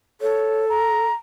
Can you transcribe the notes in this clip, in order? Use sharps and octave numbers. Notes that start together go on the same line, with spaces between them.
A4 C#5
A#5